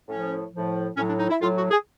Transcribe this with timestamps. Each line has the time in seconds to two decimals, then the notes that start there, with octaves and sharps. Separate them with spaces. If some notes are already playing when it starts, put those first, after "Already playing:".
0.08 A2 F3 C#4
0.52 A2 F3
0.96 A2 C#4
1.01 F#3
1.08 D4
1.19 D#4
1.30 E4
1.40 A2 F#3 F4
1.56 F#4
1.71 G#4